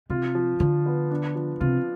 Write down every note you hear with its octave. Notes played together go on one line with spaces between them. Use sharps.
C3 F4
F3
D3 F3
B3
D4
F3
C3 F4